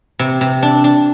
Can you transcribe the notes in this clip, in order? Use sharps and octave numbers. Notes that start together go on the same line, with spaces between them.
C3
C3
D4
D4